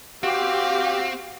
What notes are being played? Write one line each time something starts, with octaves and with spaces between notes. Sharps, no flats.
C4 F#4 G4 F5